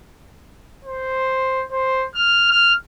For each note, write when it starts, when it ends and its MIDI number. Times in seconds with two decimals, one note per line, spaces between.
0.85 1.63 72
1.72 2.05 72
2.15 2.46 89
2.50 2.72 89